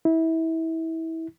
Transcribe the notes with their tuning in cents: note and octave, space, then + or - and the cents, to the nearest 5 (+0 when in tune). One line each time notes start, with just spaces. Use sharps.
E4 -25